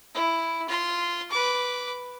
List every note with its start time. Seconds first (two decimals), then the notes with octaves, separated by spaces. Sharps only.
0.14 E4
0.69 F4 C6
1.31 B4 D6